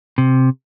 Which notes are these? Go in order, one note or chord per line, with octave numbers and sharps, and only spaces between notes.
C3